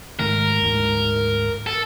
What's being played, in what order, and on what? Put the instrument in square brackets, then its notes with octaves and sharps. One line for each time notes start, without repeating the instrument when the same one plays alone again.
[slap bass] G#2 D#3 A3 [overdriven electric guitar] A#4
[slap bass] D2 G#2
[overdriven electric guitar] A4